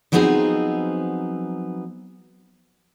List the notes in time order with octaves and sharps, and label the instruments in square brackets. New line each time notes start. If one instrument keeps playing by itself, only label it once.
[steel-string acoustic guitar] F3 F#3 B3 C4 D#4 G#4